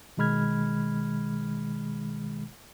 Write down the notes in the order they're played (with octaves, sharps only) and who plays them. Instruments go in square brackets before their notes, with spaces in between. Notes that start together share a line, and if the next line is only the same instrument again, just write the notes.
[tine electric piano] B2 D#3 G#3 B5 F6 G#6